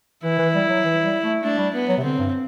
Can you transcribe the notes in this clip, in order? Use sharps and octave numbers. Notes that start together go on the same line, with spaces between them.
E3 E4
E3
G3
F#3
E3
G3
A3
A3 D4
G3
B3
F#3
C3
D3 C4
G2